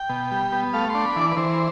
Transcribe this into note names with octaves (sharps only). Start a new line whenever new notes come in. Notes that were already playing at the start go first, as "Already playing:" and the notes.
Already playing: G5
B2
G3
B3
A3 F5
C6
D4
B5
E3 D5
B4
E3 C5